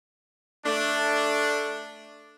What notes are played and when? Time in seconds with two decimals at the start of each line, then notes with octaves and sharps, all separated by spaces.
0.65 A3 D4